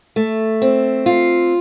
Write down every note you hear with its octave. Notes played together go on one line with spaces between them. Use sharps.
A3
C4
F4